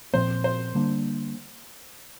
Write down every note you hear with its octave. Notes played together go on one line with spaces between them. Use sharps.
A#2 F3 C4 C5
C5
D3 G3 A#3 D4